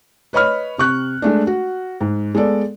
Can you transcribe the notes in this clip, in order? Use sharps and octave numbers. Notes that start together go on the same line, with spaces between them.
B4 C#5 D#5 B5 F6
C3 C#6 F#6
G#3 A3 D4
F#4
G#2
G#3 B3 A4 D5